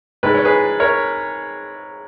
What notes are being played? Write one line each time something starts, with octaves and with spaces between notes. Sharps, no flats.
G#2 D#3 G#3 B4
C#5
G#4 B4
A#4 C#5